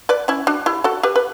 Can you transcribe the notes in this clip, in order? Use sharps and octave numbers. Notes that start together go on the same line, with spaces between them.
B4 D5
C#4 E4
D4 F#4
E4 G4
F#4 A4
G4 B4
B4